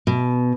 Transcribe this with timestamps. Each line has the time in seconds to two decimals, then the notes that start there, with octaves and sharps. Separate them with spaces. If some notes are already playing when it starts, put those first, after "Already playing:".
0.07 B2